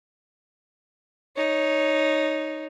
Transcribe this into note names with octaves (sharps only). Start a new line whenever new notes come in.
D#4 C#5